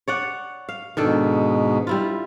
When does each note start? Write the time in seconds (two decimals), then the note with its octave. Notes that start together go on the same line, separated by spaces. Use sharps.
0.08 C#5 D5 F#5
0.69 F5
0.97 G#2 B2 D#3 D4 A4
1.87 G3 E4 F4